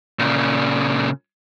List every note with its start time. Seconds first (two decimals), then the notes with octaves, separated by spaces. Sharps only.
0.19 A#2 C#3